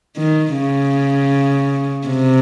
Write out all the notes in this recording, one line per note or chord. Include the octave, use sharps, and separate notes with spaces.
D#3
C#3
C3